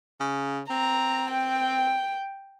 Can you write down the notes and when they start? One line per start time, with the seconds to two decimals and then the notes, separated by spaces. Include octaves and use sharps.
0.20 C#3
0.70 C4 A#5
1.31 G5